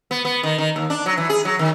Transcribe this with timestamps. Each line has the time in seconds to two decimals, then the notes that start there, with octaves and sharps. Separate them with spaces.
0.11 B3
0.25 B3
0.43 D#3
0.58 D#3
0.76 D#2
0.90 D4
1.06 F#3
1.18 E3
1.29 G#4
1.45 F#3
1.59 D#3